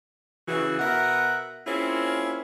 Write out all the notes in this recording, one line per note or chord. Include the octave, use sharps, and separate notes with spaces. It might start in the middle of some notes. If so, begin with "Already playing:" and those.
C#3 E3 F#4
B2 A#4 E5 F#5
A#3 C4 C#4 E4 F4 G#4